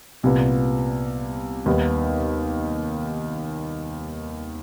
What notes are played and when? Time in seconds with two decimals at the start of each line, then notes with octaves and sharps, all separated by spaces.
0.23 C2 A#2 G3 B3
1.66 D#2 D#3 G3 B3